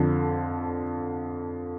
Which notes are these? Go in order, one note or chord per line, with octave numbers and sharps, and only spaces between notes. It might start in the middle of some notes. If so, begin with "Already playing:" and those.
Already playing: F2 D3 F3